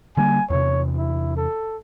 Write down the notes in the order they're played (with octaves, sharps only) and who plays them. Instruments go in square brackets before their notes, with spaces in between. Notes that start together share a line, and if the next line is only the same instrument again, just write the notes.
[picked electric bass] D3 G3 A#3 [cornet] G#5
[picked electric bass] E2 C3 [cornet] C#5
[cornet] E4
A4